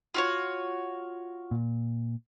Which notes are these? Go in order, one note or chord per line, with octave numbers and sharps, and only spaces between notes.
F4 F#4 C#5
A#2